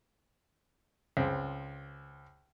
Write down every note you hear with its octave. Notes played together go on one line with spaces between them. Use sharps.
C#2 C4